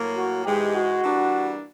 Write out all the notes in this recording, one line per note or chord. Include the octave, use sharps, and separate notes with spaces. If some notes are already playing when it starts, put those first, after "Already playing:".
Already playing: A2 F#3 A#3
F#4
G#2 E3 G#3 G4
F#4
E3 G3 A#3 D4